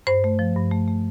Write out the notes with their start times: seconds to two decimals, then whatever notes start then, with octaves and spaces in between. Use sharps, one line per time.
0.07 G2 C5
0.24 A3
0.39 F3
0.56 G2
0.71 A3
0.88 A3